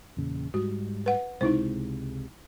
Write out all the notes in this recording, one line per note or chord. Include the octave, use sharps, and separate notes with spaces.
E2 A#2 C#3
G#2 G3 F#4
B4 F#5
C#2 C3 G#3 D#4 E4 C5